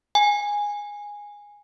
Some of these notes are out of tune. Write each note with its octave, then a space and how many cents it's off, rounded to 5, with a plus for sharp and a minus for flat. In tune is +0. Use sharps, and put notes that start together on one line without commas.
G#5 -10